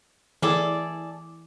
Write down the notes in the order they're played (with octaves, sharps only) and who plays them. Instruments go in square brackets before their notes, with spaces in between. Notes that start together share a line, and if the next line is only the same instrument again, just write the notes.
[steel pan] E3 [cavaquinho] G#4 A4 D5